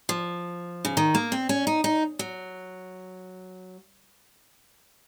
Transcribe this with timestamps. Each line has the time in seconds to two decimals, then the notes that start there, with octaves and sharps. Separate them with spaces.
0.09 F3
0.85 C#3
0.97 D#3
1.15 A#3
1.32 C4
1.49 C#4
1.67 D#4
1.84 D#4
2.19 F#3